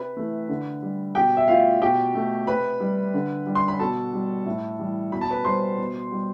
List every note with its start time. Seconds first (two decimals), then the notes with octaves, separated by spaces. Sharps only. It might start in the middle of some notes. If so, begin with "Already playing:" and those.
Already playing: C3 B4 B5
0.17 E3 A3
0.48 D3
0.82 G3
1.15 B2 G4 G5
1.37 E5
1.48 A3 F4 F5
1.81 B2 G4 G5
2.15 A3
2.47 C3 B4 B5
2.80 G3
3.14 D3
3.46 G3
3.55 C6
3.68 B5
3.79 B2 A4 A5
4.13 G3
4.46 A2
4.79 E3 G3
5.12 B2 B5
5.21 A5
5.30 B4 B5
5.45 G3 C5 C6
5.78 B2
6.11 G3